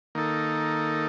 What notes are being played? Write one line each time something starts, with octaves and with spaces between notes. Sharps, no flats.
D#3 A#3 D#4 A4